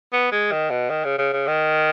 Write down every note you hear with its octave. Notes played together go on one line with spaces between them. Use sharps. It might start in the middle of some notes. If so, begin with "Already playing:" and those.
B3
G#3
D#3
B2
D#3
C#3
C#3
C#3
D#3